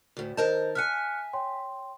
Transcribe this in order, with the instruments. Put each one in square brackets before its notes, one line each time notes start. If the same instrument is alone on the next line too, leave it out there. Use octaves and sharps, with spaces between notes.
[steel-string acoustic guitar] D2 A2
[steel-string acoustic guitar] D#3 A#4 A5 [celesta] C5 D#5 G6
[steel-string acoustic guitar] E5 F5 G#5 [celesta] F6 F#6 C#7
[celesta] C#5 G5 C6